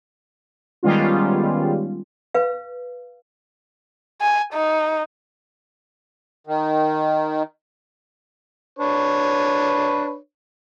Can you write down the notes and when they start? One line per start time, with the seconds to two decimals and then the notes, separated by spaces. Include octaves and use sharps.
0.83 D#3 G3 G#3 B3 C#4 F4
2.34 B4 F5
4.21 G#5
4.53 D#4
6.47 D#3
8.79 D4 B4 C#5